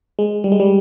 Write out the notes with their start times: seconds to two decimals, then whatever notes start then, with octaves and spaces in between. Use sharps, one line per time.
0.19 G#3
0.44 G3
0.52 G#3
0.60 G3